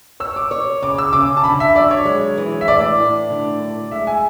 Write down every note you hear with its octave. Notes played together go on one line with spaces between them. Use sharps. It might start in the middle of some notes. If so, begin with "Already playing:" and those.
C#5 E6
D6
C#5
C#3 D6
E6
C#3 D6
A5
D3 B5
E5
F#3 D5
C#5
G#3
E3
E5
A2 D5
A2
D3
F#3
G#3 E5
G#5